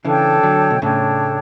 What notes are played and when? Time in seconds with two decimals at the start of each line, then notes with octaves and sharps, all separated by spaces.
0.04 C#3 E3 D4 A4 C#5 G5
0.43 D3 F#3
0.70 B2
0.82 A2 C#3 D4 A4 C#5 G5